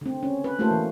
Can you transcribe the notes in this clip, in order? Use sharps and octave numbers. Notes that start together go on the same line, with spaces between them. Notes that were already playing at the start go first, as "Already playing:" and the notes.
D3 C4
C#4
B4
A3 A#3 E4 F#4 A4 C5
E3